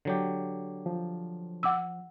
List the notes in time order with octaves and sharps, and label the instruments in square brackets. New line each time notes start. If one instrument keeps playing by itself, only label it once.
[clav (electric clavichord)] D3 F#3 G4
[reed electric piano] F3
[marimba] F#5 D6 E6